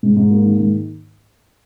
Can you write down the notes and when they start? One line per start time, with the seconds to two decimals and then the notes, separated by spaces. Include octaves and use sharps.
0.03 G#2
0.17 G#2
0.31 A#3
0.45 D#3
0.60 G#2